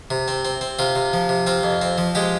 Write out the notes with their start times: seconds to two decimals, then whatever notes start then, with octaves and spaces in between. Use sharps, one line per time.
0.11 C3
0.28 C4
0.45 C4
0.61 C4
0.79 C3 F4
0.95 C3
1.13 F3
1.29 C3
1.47 C4 F4
1.63 F2
1.82 C4
1.98 F3
2.15 G#3 G4